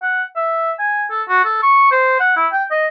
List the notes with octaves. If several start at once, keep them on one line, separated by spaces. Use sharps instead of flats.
F#5
E5
G#5
A4
F#4
A4
C#6
C5
F#5
E4
G5
D#5